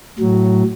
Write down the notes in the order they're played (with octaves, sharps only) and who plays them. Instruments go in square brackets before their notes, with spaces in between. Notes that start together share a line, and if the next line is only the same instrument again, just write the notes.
[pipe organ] A2 F#3